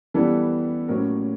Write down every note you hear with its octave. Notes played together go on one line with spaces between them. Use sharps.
E3 G3 B3 A4
A2 F#3 A#3 C#4 A#4